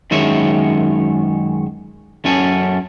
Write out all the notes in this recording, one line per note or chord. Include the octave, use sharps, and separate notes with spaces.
F#2 D#3 G#3 C#5 E5
F#2 C#4 A4 G#5